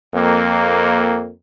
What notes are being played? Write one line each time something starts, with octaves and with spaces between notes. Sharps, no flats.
F2 A#3